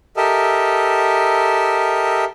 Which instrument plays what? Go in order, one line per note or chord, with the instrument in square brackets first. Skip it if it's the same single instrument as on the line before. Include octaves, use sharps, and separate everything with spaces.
[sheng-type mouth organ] G4 A4 A#4 D#5 E5